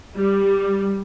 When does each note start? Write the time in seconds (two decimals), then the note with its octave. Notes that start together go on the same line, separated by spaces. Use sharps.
0.16 G3